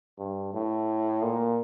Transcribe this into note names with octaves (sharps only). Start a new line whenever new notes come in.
G2
A2
A#2